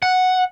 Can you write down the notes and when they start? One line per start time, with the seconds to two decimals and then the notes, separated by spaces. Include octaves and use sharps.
0.02 F#5